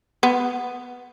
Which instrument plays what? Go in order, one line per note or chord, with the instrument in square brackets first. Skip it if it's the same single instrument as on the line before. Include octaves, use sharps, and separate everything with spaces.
[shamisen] B3